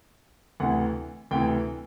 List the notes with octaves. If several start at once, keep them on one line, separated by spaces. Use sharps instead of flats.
D2 C3 E3 F#5
D2 C3 E3 G5